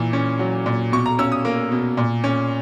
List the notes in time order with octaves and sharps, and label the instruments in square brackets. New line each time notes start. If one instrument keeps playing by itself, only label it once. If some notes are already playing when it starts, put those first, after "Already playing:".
Already playing: [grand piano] A#2 E3
C#4
F#3
A#2
B2 C#6
A#5
C#4 E6
D#6
A#3
B2
A#2
C#4